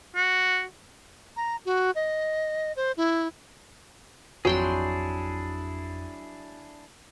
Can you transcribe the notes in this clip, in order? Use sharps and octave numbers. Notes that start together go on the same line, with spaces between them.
F#4
A#5
F#4
D#5
C5
E4
G#1 F2 F#3 D4 E4 G#4 G5 C6